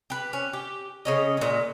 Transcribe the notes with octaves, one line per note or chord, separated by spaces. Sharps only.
G4 B4
C#4
G4
C#3 C#4 D#5
A#2 G#3